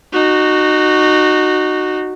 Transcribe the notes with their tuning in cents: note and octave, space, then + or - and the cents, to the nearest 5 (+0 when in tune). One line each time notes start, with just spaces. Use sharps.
D#4 -25 F#4 +0